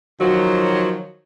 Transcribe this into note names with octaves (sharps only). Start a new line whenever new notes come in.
D#3 F3 F#3